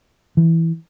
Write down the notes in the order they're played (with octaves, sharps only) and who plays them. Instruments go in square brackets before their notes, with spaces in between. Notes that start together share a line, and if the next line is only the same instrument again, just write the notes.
[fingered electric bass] E3